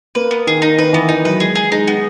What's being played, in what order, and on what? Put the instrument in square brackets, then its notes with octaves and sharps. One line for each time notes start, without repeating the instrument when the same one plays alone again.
[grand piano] A#3 [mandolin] B4
[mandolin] B3
[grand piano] D#3 [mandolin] G#4
[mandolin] D#4
[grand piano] D#3 [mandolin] B4
[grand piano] E3 [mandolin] B3
[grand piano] E3 [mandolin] D#4
[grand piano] F#3 [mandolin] B4
[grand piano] G#3 [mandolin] G#4
[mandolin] G#4
[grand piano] G#3 [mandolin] D#4
[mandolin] B3